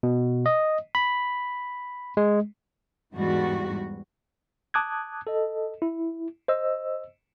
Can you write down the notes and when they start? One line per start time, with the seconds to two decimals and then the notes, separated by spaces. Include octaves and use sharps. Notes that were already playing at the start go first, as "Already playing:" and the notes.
0.03 B2
0.46 D#5
0.95 B5
2.17 G#3
3.13 E2 G#2 E3 G3 F#4
4.74 A5 D6 D#6 F#6 G#6
5.27 A4 D#5
5.82 E4
6.48 C5 D#5 E6